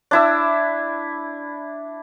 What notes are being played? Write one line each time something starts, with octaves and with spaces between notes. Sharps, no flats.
D4 E4 E6